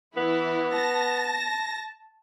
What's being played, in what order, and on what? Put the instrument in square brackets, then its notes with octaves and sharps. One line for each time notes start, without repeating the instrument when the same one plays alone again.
[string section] E3 E4 [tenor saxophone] B3
[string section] A5 A#6